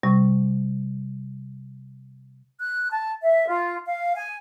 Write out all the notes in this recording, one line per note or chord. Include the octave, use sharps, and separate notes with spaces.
C3 G3 C#6
F#6
A5
E5
F4
F5
G#5